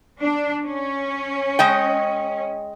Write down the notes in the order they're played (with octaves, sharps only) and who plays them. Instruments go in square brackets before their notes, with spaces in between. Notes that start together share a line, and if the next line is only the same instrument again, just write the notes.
[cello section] D4
C#4
[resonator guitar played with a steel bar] G#3 D#5 G5